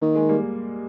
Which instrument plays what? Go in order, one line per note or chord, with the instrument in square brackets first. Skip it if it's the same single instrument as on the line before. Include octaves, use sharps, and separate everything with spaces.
[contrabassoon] D#3 [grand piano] A#3
[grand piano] G#3
G3 A#3